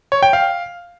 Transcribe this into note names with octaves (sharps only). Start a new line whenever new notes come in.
C#5
G5
F5